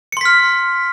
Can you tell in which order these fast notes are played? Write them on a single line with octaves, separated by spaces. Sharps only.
C#7 C6 B6 F6